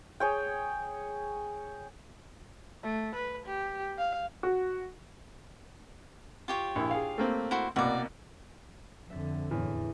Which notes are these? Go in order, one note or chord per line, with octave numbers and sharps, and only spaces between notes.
G#4 C#5 G5
A3
B4
G4
F5
F#4
F4 G4 C#5
A#1 E4
G#4 F5
A3 A#3 C4
E4 F#4 C5
C2 B2 A#3 F#4 D5
F2 D3 E5 A6
E2 A2